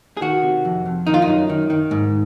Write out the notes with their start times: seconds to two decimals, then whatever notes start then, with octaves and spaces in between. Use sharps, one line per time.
0.17 G#4
0.21 D#3 F#4
0.42 C3
0.65 F2
0.86 F2
1.07 D#3 D#4
1.14 F4
1.22 D#4
1.27 F#2
1.49 D#3
1.70 D#3
1.91 G#2